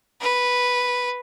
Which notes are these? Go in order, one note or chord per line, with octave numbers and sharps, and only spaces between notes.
B4